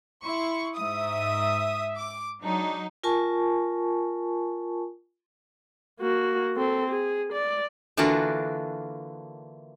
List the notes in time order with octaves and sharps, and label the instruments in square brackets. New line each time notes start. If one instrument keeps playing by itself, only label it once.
[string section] E4 C#6 [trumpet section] C6
[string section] G#2 D#6 [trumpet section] E5
[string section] D6
[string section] F#3 D#4 [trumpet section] G#3 D4
[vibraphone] F4 A#4 G#5 A5 C#6
[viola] A#3 F#4
C4 A4
G#4
D5
[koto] D3 E3 A#3 D4 F4 F#4